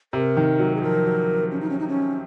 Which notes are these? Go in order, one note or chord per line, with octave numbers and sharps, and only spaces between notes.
C3 A#4
D#3
F#3
G#4
F3 A#4
F#3
C#4
D#4
C#4
D#4
C#4